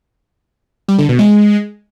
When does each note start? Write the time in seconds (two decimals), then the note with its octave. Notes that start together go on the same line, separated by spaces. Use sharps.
0.88 G3
0.99 D3
1.09 B2
1.19 G#3